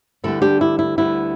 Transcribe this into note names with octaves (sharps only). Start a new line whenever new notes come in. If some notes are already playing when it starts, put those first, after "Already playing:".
D2 D3 G3 B3 E4 A4
D4 G4
E4
E4
D2 D3 G3 B3 E4